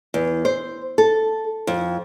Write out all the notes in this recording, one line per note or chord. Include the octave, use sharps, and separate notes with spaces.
E2
C5
A4
F2